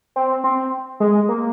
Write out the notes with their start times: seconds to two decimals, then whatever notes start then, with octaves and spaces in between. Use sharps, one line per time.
0.16 C4
0.44 C4
1.00 G#3
1.29 A#3